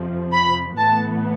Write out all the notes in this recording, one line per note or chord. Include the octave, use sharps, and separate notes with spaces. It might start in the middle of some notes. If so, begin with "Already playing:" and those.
Already playing: F2 C3 F3
B5
A2 E3 B3 A5